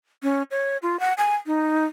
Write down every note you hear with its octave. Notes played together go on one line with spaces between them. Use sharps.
C#4
C#5
F4
F#5
G#5
D#4